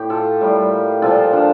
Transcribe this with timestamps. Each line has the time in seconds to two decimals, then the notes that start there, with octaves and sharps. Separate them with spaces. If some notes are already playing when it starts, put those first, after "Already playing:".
Already playing: A2 G4
0.10 F4 A4
0.41 A2 G3 A#3
1.02 A#2 F3 A#3 F4 A4
1.33 D4 F4